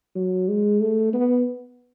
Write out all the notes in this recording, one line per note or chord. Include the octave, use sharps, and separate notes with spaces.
F#3
G#3
A3
B3